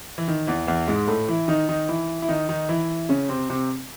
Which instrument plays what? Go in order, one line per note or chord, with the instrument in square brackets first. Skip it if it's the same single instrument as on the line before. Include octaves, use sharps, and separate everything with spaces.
[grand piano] E3
D#3
E2 E3
E2 E3
G#2 G#3
A2 A3
E3 E4
D#3 D#4
D#3 D#4
E3 E4
E4
D#3 D#4
D#3 D#4
E3 E4
C#3 C#4
C3 C4
C3 C4